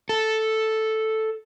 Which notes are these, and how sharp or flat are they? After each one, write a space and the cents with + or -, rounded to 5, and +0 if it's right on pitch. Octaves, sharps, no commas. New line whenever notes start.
A4 +0